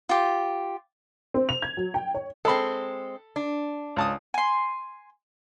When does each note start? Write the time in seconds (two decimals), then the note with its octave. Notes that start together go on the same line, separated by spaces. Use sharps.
0.09 F4 G4
1.34 C4
1.49 F7
1.62 G#6
1.77 F#3
1.94 G5
2.14 C#5
2.45 G#3 C4 A4 B5
3.36 D4
3.96 C#2 A5 D#6
4.34 G#5 C6